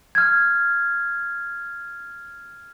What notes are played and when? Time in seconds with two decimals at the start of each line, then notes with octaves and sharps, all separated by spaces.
0.15 F6 G#6